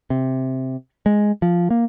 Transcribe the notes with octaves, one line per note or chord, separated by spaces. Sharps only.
C3
G#3
F3
A#3